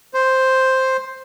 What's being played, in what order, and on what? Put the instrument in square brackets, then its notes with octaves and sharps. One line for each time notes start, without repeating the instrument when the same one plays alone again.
[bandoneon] C5